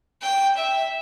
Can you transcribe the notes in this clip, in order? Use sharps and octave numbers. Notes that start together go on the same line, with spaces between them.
G5
E5